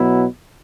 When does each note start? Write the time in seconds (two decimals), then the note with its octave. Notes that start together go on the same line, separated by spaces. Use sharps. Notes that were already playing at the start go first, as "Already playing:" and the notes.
Already playing: B2 F#3 B3 E4